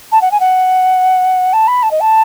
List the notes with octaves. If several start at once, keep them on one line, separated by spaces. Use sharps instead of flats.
A5
F#5
G#5
F#5
A5
B5
A5
D#5
A5